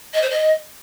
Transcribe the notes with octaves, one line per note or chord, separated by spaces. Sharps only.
D#5
C5
D#5